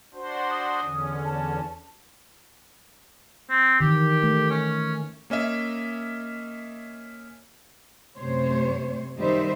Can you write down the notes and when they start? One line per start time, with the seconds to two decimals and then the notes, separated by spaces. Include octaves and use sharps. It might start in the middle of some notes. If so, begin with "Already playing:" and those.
0.14 D4 F#4 C5
0.51 D#6
0.82 E2 D3 C#4
1.25 A5
3.50 C4
3.80 D#3 E3 G4
4.23 A3
4.50 C#4
5.30 A#3 C#4 D#5 E5
8.17 F#2 C3 A3 C5 C#5
9.17 F#2 D#3 G3 D#4 C5 E5